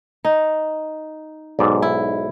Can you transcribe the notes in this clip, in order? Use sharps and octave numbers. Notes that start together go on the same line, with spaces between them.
D#4
B1 G#2 D5
E4